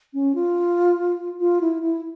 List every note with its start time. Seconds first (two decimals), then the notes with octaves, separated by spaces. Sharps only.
0.14 C#4
0.35 F4
1.40 F4
1.61 E4
1.82 E4